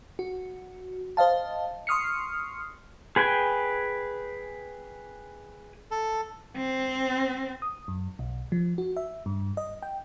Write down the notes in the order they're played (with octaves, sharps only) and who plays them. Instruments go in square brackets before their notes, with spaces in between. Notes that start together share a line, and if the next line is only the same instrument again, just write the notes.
[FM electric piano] F#4
C5 D#5 F5 A5
C6 C#6 D#6 F6 C7 C#7
[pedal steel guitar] G#4 B4 G5 G#5
[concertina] A4
[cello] C4
[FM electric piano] D#6
F#2
B1
F3
F#4
E5
G2
D#5
G5